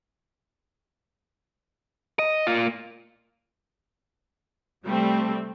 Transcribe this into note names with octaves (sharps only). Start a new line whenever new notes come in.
D#5
A#3 F4
C3 G3 A3 C4